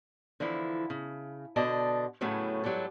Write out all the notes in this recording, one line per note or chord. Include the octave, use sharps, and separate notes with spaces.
D3 E3 F3 E4
C#3
B2 D3 D5 D#5 A5
A2 C#3 F#3 A3 B3 C#4
G#2 F#3 G3 G4 A4